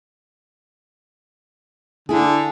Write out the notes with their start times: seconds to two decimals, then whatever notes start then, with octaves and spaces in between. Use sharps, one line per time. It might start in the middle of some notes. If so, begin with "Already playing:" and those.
2.09 D3 E4 G#4